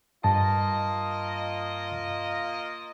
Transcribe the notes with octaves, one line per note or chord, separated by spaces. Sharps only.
G2 A#3 F4 D#5 A5